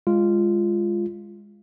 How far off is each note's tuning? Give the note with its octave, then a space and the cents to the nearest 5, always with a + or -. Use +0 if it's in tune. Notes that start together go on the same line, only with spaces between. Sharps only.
G#3 -15 F4 -10